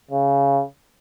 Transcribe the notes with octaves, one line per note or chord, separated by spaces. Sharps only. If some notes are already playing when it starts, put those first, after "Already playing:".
C#3